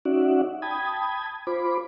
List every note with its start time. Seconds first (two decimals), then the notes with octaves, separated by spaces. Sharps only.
0.05 C#4 D#4 F#4 D5 E5 F#5
0.62 G5 A5 B5 D#6 G#6
1.47 F4 C5 B5 D6